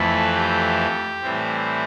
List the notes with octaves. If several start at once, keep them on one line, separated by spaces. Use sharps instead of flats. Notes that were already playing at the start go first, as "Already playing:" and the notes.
Already playing: F2 E3 A3 B4
G4
A2 E3 G3 C4